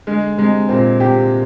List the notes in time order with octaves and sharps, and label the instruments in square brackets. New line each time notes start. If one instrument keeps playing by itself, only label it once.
[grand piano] D3 [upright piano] G#3
[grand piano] C3 [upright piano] G#3
[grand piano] A#2 [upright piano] C4
[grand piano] C3 [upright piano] G4